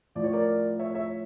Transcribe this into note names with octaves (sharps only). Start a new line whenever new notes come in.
A2 F3 D5
C#5
A#4 D5
C#5 E5
C#5 E5